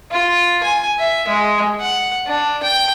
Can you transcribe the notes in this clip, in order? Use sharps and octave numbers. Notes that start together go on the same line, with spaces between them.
F4
G#5
E5
G#3
F#5
D4
G5